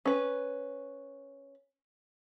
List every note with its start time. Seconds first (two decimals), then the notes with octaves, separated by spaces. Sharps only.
0.05 C#4 B4